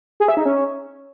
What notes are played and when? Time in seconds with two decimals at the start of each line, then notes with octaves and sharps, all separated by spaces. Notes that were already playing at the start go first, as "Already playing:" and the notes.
0.20 G#4
0.28 E5
0.37 D#4
0.45 C#4